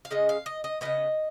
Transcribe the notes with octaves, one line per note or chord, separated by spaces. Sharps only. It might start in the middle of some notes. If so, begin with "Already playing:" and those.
F5
C#3 G#3 C#4 D#5
F5
D#5
D#5
C#3 F3 B3 D#5